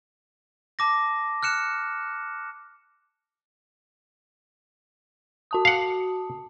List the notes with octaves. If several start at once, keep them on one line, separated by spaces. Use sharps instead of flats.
A5 D6 A#6
F6 F#6 C#7 E7
F#4 A5 D#6
F5 F#5